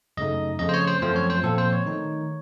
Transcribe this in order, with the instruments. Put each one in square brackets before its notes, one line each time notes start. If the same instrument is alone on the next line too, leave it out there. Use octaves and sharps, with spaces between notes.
[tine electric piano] F#2 C#3 A3 D#4 D#5
F2 C#3 A3 D#5
C5
C#5
C5
F#2 F3 A3 C4 C5
C#5
C5
A#2 F3 C4 F4 A4
C5
C#5
D#3 A3 D#4